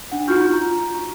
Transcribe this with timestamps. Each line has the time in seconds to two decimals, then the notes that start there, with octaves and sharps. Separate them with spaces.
0.11 D4 F#5
0.28 D#4 F4 F#4 C#6 F6 G6
0.53 A#5